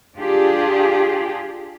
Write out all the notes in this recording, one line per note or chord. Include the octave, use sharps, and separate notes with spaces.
D4 F4 G4 G#4